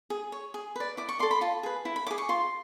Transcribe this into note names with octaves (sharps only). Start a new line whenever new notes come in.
G#4
C#5
G#4
B4 D5
E4 D6
C#6
A4 D5 C6
B5
F4 A5
G#4 B4
E4
B5
G#4 C#5 D6
C#6
F4 C6